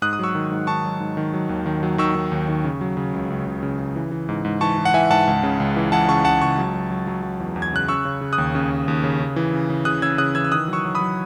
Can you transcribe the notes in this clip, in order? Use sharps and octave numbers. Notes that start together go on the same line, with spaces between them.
G#2 D#6 F#6
D#6
F#3 C#6 E6
D#3
G#2
D#3 A5 C#6
F#3
G#2
D#3
F#3
D#2
D#3
F#3
D#3 C#6 E6
D#3
D#2
D#3
C#3
F#3
C#3
C#2
C#2
C#2
C#3
C#3
E3
E3
G#2
G#2
E3 A5 C#6
E3
F#5
E3 E5 G#5
G#2 F#5 A5
C#2
C#3
C#2
E3
E3 F#5 A5
C#3 A5 C#6
C#2 F#5 A5
C#2 A5 C#6
F#3
F#3
F#3
F#3
F#3
E2
E2
G#6
C#3 F#6
C#3 C#6 E6
C#3
C#3
D#6 F#6
D#2
C#3
D#2
D#2
C#3
C#3
E3
C#3
C#3
C#3 D#6 F#6
C#3 E6 G#6
C#3 D#6 F#6
E3 E6 G#6
E6
D#3 D#6 F#6
F#3
C#6 E6
F#3
B5 D#6
F#3